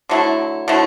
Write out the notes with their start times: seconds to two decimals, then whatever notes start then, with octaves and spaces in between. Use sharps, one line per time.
0.09 D3 F#3 A3 E4
0.68 D3 F#3 A3 E4